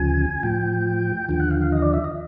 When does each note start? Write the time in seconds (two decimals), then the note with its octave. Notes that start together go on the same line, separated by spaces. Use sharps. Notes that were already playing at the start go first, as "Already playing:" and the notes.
Already playing: D2 C#3 F3 G#5
0.43 A2 F3 G5
1.29 D#2 D3 F3 G5
1.40 F#5
1.51 F5
1.61 F5
1.72 D#5
1.82 D5
1.93 E5
2.04 D#5